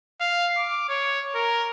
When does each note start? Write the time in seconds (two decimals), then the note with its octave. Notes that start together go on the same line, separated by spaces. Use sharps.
0.20 F5
0.57 D6
0.89 C#5
1.35 A#4